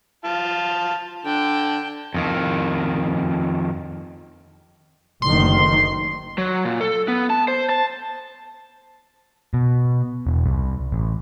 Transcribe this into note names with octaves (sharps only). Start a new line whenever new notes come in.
F4 A5
D3 G5 A5
F2 D#3
F#1 D2 D#3 C6
F#3
A#2
A4
B3
A5
C5
A5
B2
E1
C2
A1